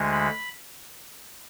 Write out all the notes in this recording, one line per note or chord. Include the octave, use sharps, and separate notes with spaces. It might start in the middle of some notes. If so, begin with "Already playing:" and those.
Already playing: D2 D3 G#3
B5